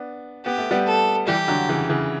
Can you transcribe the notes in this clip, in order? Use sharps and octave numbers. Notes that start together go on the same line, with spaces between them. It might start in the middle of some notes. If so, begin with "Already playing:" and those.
Already playing: B3 D4
B3 G4
A3
G3 B3
A4
E3 G3 G4
D3 F#3
C#3 E3
C#3 E3